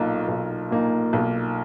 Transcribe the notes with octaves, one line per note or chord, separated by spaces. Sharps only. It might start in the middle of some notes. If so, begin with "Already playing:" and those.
Already playing: B1 A#2 A#3 D#4
B1
A#2 A#3 D#4
B1